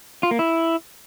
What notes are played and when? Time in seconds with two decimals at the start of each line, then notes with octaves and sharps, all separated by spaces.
0.23 F4
0.31 A#3
0.39 E4